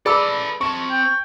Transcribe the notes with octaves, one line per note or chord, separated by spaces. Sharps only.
G#4 A4 B4 D5 B5 E6
C4 A5 C#6
G5